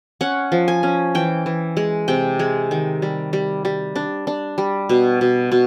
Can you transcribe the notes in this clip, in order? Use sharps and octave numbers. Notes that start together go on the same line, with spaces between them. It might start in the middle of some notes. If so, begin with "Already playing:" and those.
C#4 F#5
F3
G#5
C#4
E3 G5
E3
G#3
C3 G5
G#3
D#3
G3
G3
G3
D4
D4
G3
B2
B2
B2